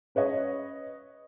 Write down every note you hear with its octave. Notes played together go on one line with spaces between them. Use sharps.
C#4 B4 C#5 D#5